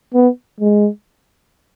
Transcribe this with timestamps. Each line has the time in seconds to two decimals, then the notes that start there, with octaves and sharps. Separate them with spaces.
0.14 B3
0.60 G#3